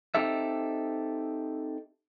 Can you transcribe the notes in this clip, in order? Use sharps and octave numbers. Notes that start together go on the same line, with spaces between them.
C4 D#4 G4 A4 E5